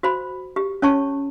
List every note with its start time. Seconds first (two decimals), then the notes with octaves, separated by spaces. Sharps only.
0.03 F#4 C5 B5
0.56 G4
0.82 C#4 C#5 A5 C#6